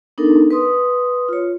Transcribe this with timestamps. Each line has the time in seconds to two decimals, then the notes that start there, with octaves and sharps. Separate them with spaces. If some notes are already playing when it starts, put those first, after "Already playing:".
0.18 B3 D4 D#4 A4 A#4
0.51 B4 C6 D#6
1.29 F4 C#5